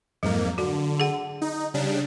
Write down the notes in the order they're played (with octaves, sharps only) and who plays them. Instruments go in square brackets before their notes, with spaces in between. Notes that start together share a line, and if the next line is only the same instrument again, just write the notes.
[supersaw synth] F2 G#2 A#3 [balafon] F#3
[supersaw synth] D3 [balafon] F#4
[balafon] G#4 F#5
[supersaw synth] D#4
C#3 G3 D4